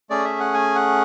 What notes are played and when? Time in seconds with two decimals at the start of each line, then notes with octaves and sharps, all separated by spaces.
0.10 A3 C#4 G#4 D5
0.25 E5
0.40 F#5
0.54 G#5
0.75 F#5